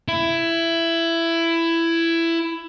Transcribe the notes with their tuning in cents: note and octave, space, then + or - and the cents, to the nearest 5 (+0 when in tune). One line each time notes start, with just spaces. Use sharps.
E4 +15